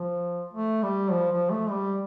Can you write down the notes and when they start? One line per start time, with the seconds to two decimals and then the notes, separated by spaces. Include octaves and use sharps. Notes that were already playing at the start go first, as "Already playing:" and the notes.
Already playing: F3
0.54 A3
0.83 G3
1.12 F3
1.32 F3
1.51 A3
1.70 G3